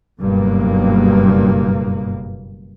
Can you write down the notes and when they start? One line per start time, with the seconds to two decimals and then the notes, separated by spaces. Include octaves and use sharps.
0.21 F#1 G2 B2 A#3